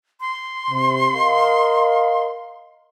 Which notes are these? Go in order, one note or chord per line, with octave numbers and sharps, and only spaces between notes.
C6
C3
A#4 D#5 F5